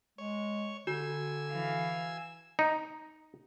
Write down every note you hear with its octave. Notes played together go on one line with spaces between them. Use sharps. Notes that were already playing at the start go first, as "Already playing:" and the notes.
G#3 C#5
D3 F#4 G#5 E6
E3 F5
D#4